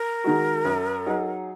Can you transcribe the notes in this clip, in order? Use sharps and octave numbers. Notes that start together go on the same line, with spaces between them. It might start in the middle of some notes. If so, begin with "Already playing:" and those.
Already playing: A#4
D#3 G#3 F#4
F#2
F#3 D#4 G#4